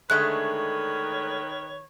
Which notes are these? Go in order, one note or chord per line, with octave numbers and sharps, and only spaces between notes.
D3 D#3 G#3 A3 B4 C#5 F#6